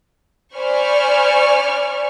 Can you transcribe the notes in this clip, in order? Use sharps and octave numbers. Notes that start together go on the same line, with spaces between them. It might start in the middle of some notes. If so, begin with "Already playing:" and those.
C5 D5 G#5 B5 C#6 F6